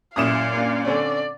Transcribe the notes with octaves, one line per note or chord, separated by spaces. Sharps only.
A1 F#2 A#2 F5 D#6 E7
A#3 D4 F4
D3 C4 C#4 D5